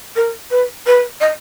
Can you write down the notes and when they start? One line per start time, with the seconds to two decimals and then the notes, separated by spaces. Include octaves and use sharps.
0.16 A#4
0.51 B4
0.86 B4
1.21 D#5